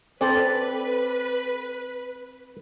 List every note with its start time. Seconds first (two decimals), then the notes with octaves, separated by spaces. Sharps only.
0.21 C4 A4 B4 D5